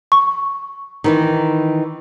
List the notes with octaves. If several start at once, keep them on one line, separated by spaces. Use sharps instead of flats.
C#6
D#3 E3 D#4